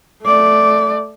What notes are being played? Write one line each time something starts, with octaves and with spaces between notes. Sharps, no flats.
A3 D5